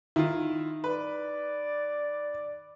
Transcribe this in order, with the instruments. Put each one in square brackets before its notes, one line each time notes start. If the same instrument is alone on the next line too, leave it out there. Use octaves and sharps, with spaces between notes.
[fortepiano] D#3 [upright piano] E4 F4
[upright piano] B4 [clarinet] D5